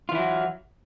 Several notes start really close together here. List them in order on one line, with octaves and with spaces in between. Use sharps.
F4 E3 E4 F#3